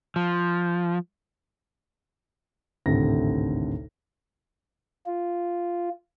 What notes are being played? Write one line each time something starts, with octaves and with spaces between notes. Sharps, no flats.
F3
G#1 D2 A2 C3 A3 A#6
F4